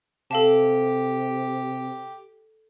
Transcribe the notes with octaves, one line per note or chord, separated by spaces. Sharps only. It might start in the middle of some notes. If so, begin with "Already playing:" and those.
C3 G4 A4 F5 A5